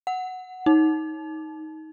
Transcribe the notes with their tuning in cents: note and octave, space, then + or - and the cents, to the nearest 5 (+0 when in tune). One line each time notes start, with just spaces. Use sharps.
F#5 +0
D#4 +20